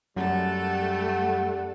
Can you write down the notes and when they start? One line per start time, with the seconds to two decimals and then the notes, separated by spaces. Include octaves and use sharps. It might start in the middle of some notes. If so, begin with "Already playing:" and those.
0.16 F#2 G3 A3 A4 F#5